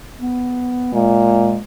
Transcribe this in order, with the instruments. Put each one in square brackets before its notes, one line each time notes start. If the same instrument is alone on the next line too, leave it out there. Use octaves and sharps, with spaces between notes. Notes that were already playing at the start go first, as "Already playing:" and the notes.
[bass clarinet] B3
[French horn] A#2 [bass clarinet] G#3